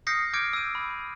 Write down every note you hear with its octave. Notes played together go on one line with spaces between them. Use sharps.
D#6 F6 G6 A#6 C7 C#7
D6 F6 G6 G#6 C#7 D7
E6 D#7
B5